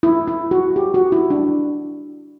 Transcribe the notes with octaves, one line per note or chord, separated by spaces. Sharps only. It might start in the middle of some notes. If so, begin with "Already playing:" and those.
E4
E4
F#4
G4
F#4
E4
D4